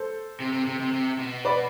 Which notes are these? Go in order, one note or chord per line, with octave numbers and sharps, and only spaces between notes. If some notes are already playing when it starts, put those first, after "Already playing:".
Already playing: A4 C5
C3
C3
C3
C3
C3
B2
B4 D5